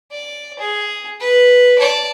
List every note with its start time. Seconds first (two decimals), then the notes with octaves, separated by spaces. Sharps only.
0.12 D5
0.59 G#4
1.20 B4
1.79 D5 A5